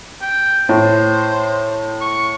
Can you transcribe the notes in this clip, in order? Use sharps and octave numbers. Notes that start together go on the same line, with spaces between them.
G5
A2 C5
C#6